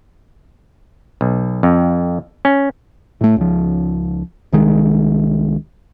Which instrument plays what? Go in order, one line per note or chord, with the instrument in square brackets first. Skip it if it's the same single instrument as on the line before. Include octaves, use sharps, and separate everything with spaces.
[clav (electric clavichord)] B1
F2
C#4
[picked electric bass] A2 A3
C#2 F3
C2 D#3 G#3